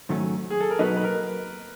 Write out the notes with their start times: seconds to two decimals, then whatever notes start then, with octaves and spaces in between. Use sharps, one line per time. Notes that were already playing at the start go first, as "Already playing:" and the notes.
0.09 G#2 D#3 F#3 A3 C#4
0.50 G#4
0.60 A4
0.71 A#4
0.79 B2 F#3 B3 D#4 B4
0.96 B4
1.04 A#4